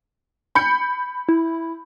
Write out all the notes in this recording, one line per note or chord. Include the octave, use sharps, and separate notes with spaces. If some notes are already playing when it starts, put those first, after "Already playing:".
B5 G6 C#7
E4